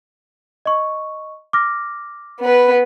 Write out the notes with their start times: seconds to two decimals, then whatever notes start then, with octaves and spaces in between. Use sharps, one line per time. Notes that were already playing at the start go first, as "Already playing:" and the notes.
0.66 D#5 C#6
1.53 D6 F6 A#6
2.41 B3 B4